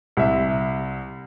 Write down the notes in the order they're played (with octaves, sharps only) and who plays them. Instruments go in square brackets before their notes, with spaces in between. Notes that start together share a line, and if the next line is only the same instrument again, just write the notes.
[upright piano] C2 E5